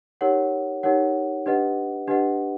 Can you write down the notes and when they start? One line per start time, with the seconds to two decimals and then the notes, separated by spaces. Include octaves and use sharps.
0.21 D#4 G4 A#4 C#5 F#5
0.83 D#4 G4 A#4 C#5 F#5
1.46 D4 G4 B4 D#5 F#5
2.07 D4 G4 B4 D#5 F#5